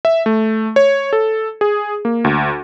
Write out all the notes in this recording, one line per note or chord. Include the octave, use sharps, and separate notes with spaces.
E5
A3
C#5
A4
G#4
A#3
D2